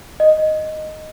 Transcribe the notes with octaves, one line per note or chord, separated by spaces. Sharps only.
D#5